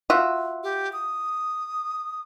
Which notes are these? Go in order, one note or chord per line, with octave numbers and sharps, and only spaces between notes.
F4 F#4 E5
G4
D#6